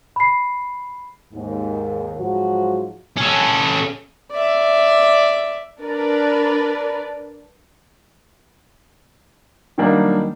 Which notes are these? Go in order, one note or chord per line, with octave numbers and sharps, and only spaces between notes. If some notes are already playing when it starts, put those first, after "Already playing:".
B5 C7
D#2 G#2
G#2 F3 F#3 F#4
C#4 A4
D5 E5
D4 A#4 B4 D5
D#3 F#3 G3 A#3 D4 D#4